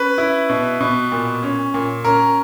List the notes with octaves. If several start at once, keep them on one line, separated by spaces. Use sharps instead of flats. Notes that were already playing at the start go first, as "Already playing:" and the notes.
Already playing: C#4 B4
E4
B2
B2
A#2
C#4
A#2
C#4 A#4